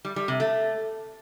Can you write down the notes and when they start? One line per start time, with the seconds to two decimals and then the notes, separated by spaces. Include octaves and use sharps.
0.05 G3
0.16 G3
0.28 C3
0.40 A3